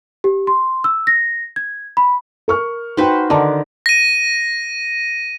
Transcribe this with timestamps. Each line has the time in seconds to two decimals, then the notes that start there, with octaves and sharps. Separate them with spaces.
0.24 G4
0.47 C6
0.84 E6
1.07 A#6
1.56 G#6
1.97 B5
2.48 A#4 C#6 F6
2.97 D#4 F#4 B4 C5 G5
3.30 D3 D#3 A5 A#5 D6
3.86 A#6 D#7